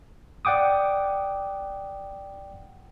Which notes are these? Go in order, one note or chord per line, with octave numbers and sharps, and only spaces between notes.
D5 F#5 G5 D6 D#6